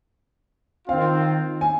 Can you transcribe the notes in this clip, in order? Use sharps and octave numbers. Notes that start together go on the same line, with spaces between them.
D#3 C4 F4 F5
G#5